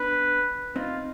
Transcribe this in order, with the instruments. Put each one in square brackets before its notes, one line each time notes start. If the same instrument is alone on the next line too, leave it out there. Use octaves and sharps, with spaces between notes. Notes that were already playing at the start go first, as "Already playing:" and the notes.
Already playing: [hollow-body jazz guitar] B3 D4 [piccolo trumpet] B4
[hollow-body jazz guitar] C4 D#4 [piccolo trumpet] F4